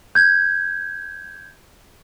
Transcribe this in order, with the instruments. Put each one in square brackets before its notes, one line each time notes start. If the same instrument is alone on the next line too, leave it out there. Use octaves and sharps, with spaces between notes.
[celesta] G6 G#6